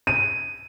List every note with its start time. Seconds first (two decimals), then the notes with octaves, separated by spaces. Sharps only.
0.07 D#7